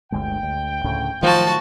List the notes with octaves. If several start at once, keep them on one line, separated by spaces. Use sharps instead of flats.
G1 D2 G#3 G5
D2
D2 A2 C#3
D#3 F3 F#3 A3 F#4 A5